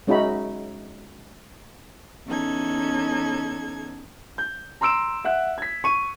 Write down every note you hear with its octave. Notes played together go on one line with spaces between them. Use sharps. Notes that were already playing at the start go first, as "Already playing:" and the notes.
G#3 C#4 D#4 F#4 E5 B5
E2 C#4 D#4 A4 G#6
G6
A#5 C6 E6 D7 E7
E5 F#5 F#6
G#6 B6
C#6 D#7